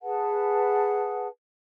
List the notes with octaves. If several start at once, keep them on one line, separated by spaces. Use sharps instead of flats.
G#4 B4 F#5 A5